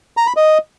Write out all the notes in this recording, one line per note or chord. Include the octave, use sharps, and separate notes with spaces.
A#5
B5
D#5